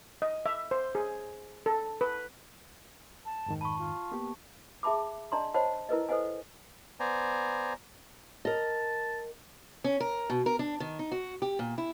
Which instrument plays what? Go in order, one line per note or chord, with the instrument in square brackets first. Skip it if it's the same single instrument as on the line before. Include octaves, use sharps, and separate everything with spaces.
[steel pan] D#5
E5
C5
G#4
A4
B4
[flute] A5
[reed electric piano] F2 G#2 D#3
[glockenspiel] A5 C#6 [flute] B5
[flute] F4
[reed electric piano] A#3 B3 G4
[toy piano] G#4 E5 A5 B5 D6
D4 D5 D#5 A5 A#5 C6
C5 C#5 D#5 F#5 A5 B5
E4 A#4 B4 D#5
A4 B4 C5 D#5 F#5 G#5
[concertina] B3 C5 D5 G#5 A#5
[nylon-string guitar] A#4 D#5 [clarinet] A5
[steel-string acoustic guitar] C#4
A#4
B2
A#4
D4
D#3
D#4
F#4
G4
A#2
E4